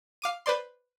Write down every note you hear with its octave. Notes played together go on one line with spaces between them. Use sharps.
F5 D6 D#7
B4 C5 D5 C6